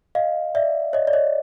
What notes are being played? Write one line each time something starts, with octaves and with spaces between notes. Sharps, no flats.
D#5 F5
D5 E5
C#5 D#5
D5
C#5 D#5